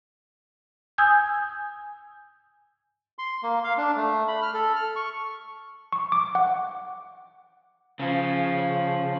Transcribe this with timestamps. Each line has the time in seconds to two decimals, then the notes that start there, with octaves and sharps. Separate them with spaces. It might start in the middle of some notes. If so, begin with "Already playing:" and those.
0.98 G#5 D#6 E6 G6 G#6
3.19 C6
3.43 A#3
3.64 F5
3.78 D4
3.96 A3
4.28 B5
4.42 F6
4.54 A4
4.76 F6
4.96 C#6
5.92 C#6
6.12 D6
6.35 F#5
7.99 C#3 F3